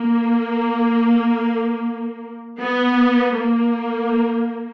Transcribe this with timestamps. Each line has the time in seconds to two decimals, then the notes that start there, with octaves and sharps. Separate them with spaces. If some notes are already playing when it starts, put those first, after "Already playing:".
Already playing: A#3
2.60 B3
3.36 A#3